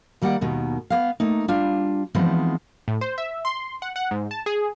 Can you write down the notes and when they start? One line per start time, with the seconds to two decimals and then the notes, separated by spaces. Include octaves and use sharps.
0.22 D#3 G3 A#3 D5 F#5
0.41 D#2 B2 D#3
0.90 B3 F5
1.20 A3 A#3 D#4
1.48 G3 D4 F4
2.15 E3 F3 G#3 B3 C4 D#4
2.88 A2
3.01 C5
3.18 E5
3.45 C6
3.82 F#5
3.96 F#5
4.11 G#2
4.31 A5
4.46 G#4